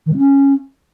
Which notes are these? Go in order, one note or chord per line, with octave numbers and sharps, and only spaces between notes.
D#3
G#3
C#4